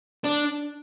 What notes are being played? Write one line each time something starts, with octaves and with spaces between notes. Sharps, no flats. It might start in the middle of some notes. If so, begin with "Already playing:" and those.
D4